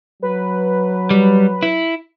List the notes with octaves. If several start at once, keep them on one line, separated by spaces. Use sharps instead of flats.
F#3 B4
G3
E4